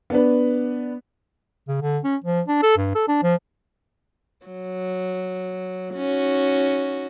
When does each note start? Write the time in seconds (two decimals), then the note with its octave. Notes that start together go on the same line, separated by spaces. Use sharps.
0.10 B3 D4 B4
1.68 C#3
1.82 D3
2.04 C#4
2.24 F3
2.48 D4
2.63 A4
2.77 G2
2.95 A4
3.08 D4
3.23 F3
4.46 F#3
5.95 C#4 D#4 F#4